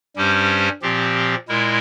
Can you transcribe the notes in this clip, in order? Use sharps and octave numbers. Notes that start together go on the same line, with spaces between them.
G2 G3 C#4 G4 C5
A#2 F3 C4 G4
A#2 G#3 E4 A#4